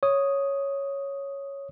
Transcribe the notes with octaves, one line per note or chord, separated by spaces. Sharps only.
C#5 D#6